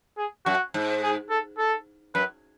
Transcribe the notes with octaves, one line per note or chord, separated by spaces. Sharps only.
G#4
F#2 F#4
G#2
G#4
A4
A4
F#2 B4